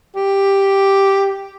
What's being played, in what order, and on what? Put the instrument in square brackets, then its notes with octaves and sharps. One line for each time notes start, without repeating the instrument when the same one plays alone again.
[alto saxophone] G4